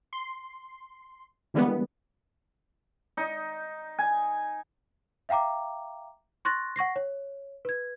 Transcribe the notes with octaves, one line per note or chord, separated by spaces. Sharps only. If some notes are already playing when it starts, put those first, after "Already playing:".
C6
D3 E3 G3 G#3 A#3 B3
D#4
G#5
E5 F5 G5 A#5 D6
C6 C#6 F#6 A6 A#6
F#5 C#6 A#6 C7
C#5
B4 G#6